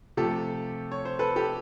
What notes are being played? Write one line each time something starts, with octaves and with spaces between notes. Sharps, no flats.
C3 F3 A3 G4 A4
C#5
C5
A4 B4
G4 A4